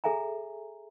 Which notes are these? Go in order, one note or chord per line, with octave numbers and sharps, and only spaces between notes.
G#4 A4 E5 G#5 A#5